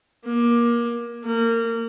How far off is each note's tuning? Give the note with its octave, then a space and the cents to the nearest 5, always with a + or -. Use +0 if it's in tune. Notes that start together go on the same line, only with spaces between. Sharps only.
A#3 +25
A#3 -25